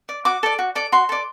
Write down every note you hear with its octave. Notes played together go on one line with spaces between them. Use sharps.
D5
F#4 D6
A4 D5
F#4
A4 D5
F#4 C6
A4 D5